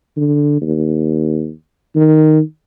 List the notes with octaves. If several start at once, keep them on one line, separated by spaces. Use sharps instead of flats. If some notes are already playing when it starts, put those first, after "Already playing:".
D3
D#2
D#3